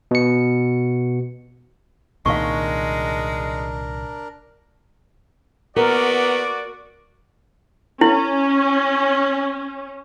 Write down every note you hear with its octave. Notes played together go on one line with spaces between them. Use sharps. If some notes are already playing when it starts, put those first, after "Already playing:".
B2 C#7
C2 A#2 D#3 G#3 D4 A#4 F5 C#6
B3 F#4 A#4 D5 D6
C#4 E4